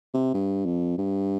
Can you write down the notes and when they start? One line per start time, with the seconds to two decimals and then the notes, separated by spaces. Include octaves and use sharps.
0.14 C3
0.34 G2
0.65 F2
0.98 G2